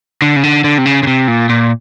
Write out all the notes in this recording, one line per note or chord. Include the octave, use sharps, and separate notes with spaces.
D3
C#3
D3
D3
C3
C#3
C#3
C3
A#2
A#2